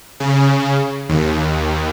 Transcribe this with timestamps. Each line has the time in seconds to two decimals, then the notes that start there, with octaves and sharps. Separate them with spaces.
0.20 C#3
1.09 D#2